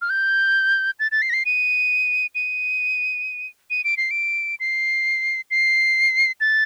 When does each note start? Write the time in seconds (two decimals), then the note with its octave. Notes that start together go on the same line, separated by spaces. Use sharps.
0.02 F6
0.10 G6
1.00 A6
1.12 A6
1.22 C7
1.30 A#6
1.33 C7
1.45 D#7
2.35 D#7
3.70 D#7
3.84 D7
3.97 C7
4.11 D7
4.60 C7
5.51 C7
6.41 A6